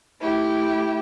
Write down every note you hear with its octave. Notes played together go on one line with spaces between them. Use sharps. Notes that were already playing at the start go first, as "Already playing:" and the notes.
A3 E4 G4